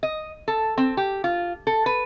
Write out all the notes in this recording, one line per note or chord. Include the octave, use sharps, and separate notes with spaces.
D#5
A4
C4
G4
F4
A4
B4